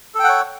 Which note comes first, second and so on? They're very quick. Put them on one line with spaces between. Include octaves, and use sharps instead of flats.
A4 G5 F#5 C#5